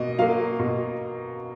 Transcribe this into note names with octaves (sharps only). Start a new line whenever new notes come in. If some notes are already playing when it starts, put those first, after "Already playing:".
Already playing: B2 A#3 D#5
F#3 A#3 F5
B2